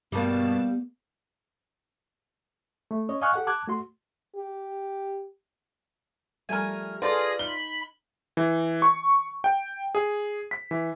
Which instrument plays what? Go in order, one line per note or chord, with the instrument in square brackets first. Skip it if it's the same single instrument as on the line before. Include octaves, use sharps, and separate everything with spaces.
[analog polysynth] G2 B2 A5 [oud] G3 A#3 [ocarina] B3
[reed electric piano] A3
C#4 C#5 D#5
D#5 F5 G#5 C#6 F6 F#6
G4 A4 F#5
A5 D6 F#6 G#6
A3 F#4 C6
[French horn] G4
[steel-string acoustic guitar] F3 G3 A3 [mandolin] A#4 G#5
[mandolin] F4 D5 [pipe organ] G#4 A#6 [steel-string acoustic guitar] A4 A5 [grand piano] B4
[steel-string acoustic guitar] D#4 [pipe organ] B5 [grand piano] G7
[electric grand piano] E3
C#6
G5
G#4
B6
E3